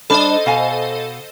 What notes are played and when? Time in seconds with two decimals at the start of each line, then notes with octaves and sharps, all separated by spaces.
0.10 G3 D4 A4 C5 D#5
0.46 B2 F5 G#5